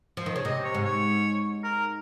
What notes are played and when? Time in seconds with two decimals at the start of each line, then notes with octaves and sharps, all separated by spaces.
0.17 F3
0.26 D#3
0.36 C#3
0.45 C3 D#5
0.64 C#5
0.74 G#2
0.84 C#5
1.64 A#4